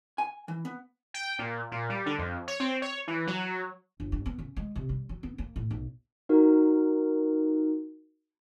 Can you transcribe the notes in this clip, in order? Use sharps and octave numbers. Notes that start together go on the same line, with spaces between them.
G#5
E3
B3
G5
A#2
A#2
G3
D3
F2
C#5
C4
C#5
E3
F#3
G1
G2
B3
C#3
G#3
C3
G3
F#3
B3
A#3
A2
B1
D#4 F#4 A#4